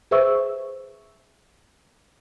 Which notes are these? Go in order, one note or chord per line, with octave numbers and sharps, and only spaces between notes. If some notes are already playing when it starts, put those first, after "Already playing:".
G#4 B4 C5 E5 C#6 E6